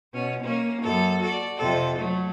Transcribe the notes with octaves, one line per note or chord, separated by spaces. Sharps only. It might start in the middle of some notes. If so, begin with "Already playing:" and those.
B2 C#4
A#3 C#4
F#2 A4
F#4 A4 D5
F2 C3 A4
F#3 A3